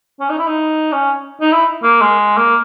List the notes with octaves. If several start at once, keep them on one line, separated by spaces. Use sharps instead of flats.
C#4
D#4
E4
D#4
C#4
D#4
E4
A#3
G#3
A#3